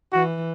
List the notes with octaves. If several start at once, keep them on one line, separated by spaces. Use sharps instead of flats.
E3 F#4